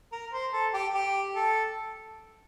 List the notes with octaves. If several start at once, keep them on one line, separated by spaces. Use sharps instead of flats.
A#4
C5
A4
G4
G4
A4